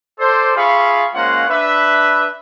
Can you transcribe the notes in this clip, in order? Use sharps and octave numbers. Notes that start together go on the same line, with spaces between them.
A4 C5 D5
F4 G#4 E5 F5 B5 C#6
G#3 A#3 C#4 F4 C5 F#5
D4 B4 E5